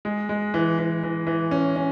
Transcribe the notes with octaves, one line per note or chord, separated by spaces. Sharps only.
G#3
G#3
E3
E3
E3
E3
C#4
C#4